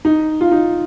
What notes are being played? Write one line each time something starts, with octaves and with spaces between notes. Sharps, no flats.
D#4
F4
D#4